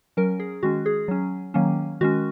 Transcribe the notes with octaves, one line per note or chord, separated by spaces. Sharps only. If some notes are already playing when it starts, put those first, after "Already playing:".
F#3 C#4 A#4
G#4
D#3 G#3 C#4 F#4
G#4
F#3 C#4
D#3 F#3 A#3 C#4
D#3 G#3 C#4 F#4